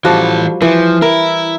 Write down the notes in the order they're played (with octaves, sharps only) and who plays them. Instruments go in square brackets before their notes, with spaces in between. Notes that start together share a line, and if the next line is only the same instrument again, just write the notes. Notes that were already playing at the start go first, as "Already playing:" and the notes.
[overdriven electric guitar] E3 A4 [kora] F3 G3 F#4
[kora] E3 [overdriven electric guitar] F3
[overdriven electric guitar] E4 [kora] A#4